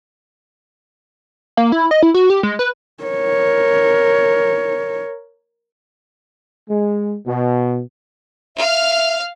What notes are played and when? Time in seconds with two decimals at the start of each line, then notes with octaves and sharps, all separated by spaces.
1.57 A#3
1.72 E4
1.91 D#5
2.03 E4
2.14 F#4
2.30 G4
2.43 G#3
2.59 B4
3.03 A#4 C#5
6.70 G#3
7.27 B2
8.57 E5 F5 F6